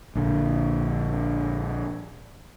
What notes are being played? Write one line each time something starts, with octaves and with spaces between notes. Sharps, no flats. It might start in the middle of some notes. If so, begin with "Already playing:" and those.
A#1 D3